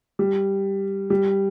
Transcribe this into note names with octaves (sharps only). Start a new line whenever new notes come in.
G3
G3